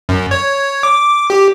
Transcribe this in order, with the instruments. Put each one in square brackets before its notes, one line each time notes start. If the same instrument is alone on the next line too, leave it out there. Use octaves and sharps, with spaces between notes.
[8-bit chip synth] F#2
C#5
D6
G4